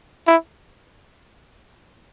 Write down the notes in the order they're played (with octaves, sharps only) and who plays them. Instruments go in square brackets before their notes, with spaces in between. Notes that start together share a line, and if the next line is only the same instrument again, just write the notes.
[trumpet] E4